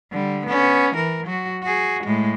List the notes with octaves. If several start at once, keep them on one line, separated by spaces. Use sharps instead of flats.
D3 G3
B3 C#4
E3 A#4
F#3 F#4
F#4 G#4
A2 G#3